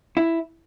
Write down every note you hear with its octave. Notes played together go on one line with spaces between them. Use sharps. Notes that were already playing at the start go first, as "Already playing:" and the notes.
E4